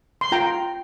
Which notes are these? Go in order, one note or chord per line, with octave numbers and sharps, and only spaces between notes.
C6
F4 G5 A#5